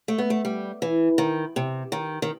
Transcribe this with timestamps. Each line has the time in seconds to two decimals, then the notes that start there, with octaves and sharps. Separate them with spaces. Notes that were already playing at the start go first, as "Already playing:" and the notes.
0.08 A3
0.18 B3
0.30 A3
0.45 G3
0.82 E3
1.18 D#3
1.56 C3
1.92 D#3
2.22 D#3